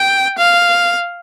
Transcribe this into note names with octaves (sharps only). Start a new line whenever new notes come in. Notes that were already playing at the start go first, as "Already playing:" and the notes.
Already playing: G5
F5